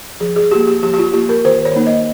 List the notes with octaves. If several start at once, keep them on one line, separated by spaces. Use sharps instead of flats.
F3 G#4
G#4
A#3 F4 G4
G4
F3 G4
G4
F4
A#3 F4 G4
A#4
D#3 C5
C#5
A#3 D#4
D#5